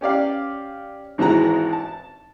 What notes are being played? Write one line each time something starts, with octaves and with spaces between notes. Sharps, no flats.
C#4 G4 D5 F5
G#1 G#2 E3 G#3 F#4 A#5
A5